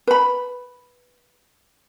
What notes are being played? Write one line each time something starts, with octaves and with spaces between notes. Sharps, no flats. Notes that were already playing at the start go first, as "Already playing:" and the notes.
B4 B5